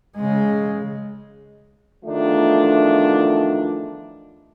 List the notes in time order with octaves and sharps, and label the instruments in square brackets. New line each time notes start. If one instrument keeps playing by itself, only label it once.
[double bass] C#3 G#3
[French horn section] E2 D#3 F3 A3 D4